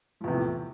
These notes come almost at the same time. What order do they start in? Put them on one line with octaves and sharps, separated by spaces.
F3 E2 C3 A2